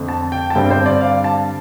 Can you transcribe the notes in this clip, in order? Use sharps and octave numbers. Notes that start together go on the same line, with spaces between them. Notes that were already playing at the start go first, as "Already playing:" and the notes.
Already playing: F2 D3 A3 C4
A5
G5
A5
G2 D3 G3 C4 G5
C5
D5
F5
A5